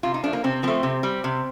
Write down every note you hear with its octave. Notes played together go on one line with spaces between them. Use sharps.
C3 F4
D#4
F3 A3 D4
A#3
C3 C4
F3 A3 C4
C3
G3
C3